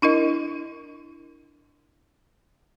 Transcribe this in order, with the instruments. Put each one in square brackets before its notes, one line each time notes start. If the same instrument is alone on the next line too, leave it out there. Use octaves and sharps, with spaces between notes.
[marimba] D4 E4 A#4 D#5